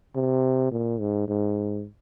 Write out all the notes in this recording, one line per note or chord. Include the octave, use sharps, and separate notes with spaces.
C3
A#2
G#2
G#2